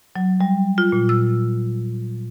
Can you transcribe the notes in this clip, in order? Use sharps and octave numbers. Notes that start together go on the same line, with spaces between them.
F#3
G3
F4
A#2
E6